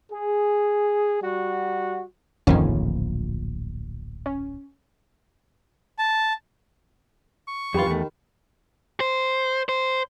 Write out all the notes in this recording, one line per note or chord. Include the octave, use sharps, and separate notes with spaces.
G#4
G3 F#4
D1 A#1 F2 D#3 F3 C#4
C#4
A5
C#6
F2 D#3 E3 G3 F4 G4 G5 B5
E2 D#3 A3
C5
C5